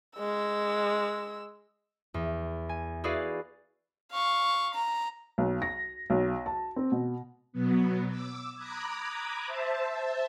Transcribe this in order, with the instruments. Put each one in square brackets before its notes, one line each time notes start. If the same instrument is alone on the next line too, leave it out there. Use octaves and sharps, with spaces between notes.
[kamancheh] G#3 E6
[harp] E2
G#5
E4 F#4 G#4 B4 D5 F5
[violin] F5 C#6
A#5
[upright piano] B1
A#6
B1
A5
C4
B2
[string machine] B2 F#3 B3
D6 E6
A#5 B5 D6 D#6 F#6 G#6
C5 E5 A5